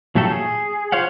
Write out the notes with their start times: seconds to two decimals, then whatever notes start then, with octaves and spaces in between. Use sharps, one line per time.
0.15 A#2 F#3 A3 G4 A4
0.31 G#4
0.92 F4 C5 C#5 F5 F#5